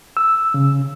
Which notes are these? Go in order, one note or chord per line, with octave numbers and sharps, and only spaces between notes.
E6
C#3